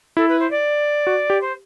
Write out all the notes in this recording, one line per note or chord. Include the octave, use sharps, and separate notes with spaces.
E4 A4
B4
C5
D5
F#4
G4
C5